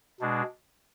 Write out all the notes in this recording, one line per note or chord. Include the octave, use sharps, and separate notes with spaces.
B2 G#3 D4